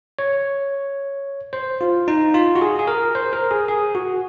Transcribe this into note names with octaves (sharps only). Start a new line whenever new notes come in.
C#5
C5
F4
D#4
F4
F#4
G#4
G#4
A#4
C5
A#4
G#4
G#4
F#4